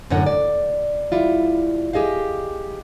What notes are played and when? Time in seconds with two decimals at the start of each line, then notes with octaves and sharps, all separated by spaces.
0.10 F#2 A2 D3 C#5 F#5
0.26 D5
1.12 G3 E4 F4
1.93 G4 G#4 D#5 F5